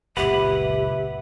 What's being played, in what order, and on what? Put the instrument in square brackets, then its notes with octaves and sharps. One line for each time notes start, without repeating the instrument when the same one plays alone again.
[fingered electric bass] F#1 C#2 A#2 [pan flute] G4 [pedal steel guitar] B4 F#5 [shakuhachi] E5